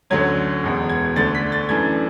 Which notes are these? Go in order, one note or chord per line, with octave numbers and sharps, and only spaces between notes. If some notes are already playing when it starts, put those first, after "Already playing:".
D2 D3 F#3 C#4 G#6
E1 E2 B2 G#3
G#6
D2 D3 A3 D4 A6
B6
A6
F#2 E3 A3 D4 G#6